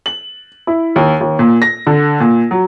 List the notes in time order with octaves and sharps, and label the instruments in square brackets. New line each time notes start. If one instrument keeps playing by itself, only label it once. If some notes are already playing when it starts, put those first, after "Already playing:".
[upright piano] F#7
E4
D#2
D#2
A#2
A#6
D3
A#2
F#3